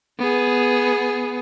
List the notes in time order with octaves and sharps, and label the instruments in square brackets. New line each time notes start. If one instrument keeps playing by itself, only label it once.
[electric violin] B3 G#4